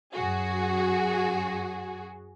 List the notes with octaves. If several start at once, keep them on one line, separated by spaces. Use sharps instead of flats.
F#2 F#4 G#4